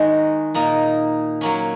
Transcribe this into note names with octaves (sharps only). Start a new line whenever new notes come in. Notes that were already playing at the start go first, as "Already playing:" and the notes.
Already playing: D#3 G#3 D#4 F#4
A#2 A#3 D#4
F#3 A#3 C#4